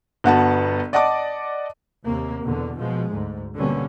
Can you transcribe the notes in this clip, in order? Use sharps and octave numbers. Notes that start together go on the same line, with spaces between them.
G1 B3 F#4 A5
D5 D#5 F#5 A5 D6
D#2 C3 A#3
E2 B2 D3
B2 F3 G#3
D2 G#2
B2 D3 G3 A#3 B3 C#4